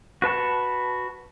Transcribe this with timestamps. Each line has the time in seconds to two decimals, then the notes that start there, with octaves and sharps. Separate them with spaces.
0.22 F#4 B4 A5 C#6